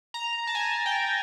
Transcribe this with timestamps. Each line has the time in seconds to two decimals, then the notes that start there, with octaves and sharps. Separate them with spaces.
0.14 A#5
0.47 A5
0.55 G#5
0.86 G5